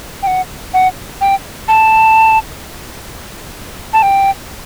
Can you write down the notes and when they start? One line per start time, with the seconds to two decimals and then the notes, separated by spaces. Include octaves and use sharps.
0.23 G5
0.27 F#5
0.74 F#5
1.21 G5
1.68 A5
3.93 A5
4.03 G5